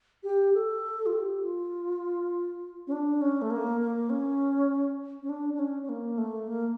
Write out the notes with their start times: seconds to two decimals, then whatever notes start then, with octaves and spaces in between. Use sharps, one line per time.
0.23 G4
0.54 A4
1.06 F4
1.13 G4
1.43 F4
2.87 C#4
2.92 D4
3.21 C#4
3.42 A3
3.50 A#3
3.81 A#3
4.10 C#4
5.22 C#4
5.29 D4
5.54 D4
5.59 C#4
5.83 C#4
5.89 A#3
6.18 A3
6.47 A#3